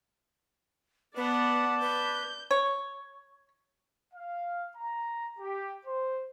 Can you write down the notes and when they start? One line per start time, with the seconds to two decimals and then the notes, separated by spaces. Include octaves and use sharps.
1.17 B3 B4 D5 F#5 A5
1.81 B4 G6
2.51 C#5
4.14 F5
4.76 A#5
5.39 G4
5.84 C5